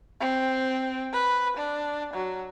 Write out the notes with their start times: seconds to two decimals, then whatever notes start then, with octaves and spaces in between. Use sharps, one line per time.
0.20 C4
1.13 B4
1.57 D4
2.14 F#3